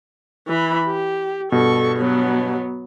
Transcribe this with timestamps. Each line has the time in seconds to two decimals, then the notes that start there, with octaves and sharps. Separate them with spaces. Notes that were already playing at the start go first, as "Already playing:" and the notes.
0.48 E3 B5
0.86 G4
1.52 G2 B2 A4 C#6
1.98 F#3 B3